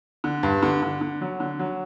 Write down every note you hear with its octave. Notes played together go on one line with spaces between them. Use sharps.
D3
G2
D3
D3
D3
F#3
D3
F#3